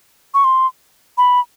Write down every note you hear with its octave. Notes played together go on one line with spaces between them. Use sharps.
C#6
C6
B5